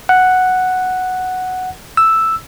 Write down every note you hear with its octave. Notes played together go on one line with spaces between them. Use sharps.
F#5
E6